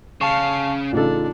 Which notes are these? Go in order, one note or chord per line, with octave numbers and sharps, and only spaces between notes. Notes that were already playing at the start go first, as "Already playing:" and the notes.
C#3 F5 A5 C#6
A1 C#3 D4 D#4 F4 A4